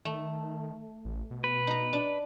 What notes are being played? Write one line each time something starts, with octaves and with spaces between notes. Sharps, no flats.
D#3 A3
A1
B2
B4
D#4 A#5
D4